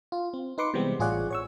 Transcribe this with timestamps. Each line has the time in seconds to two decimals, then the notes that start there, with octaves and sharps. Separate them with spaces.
0.12 F4
0.34 C4
0.58 D#4 B4 C6 D6 C#7
0.74 C3 E3 G3 G#3 B3 C4
0.99 A1 F4 G#4 C#5 D5 F#5
1.31 C#5 C#6 E6